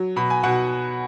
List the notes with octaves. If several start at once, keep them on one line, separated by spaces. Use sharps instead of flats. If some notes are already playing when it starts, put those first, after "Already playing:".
Already playing: F#3
B2 B5
G#5
B2 F#5